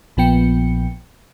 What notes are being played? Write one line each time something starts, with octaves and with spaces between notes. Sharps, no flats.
A#1 A#2 F3 B3 G5 C#7